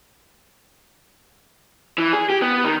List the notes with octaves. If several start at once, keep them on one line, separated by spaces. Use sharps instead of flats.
E3
G#4
G4
B3
D#3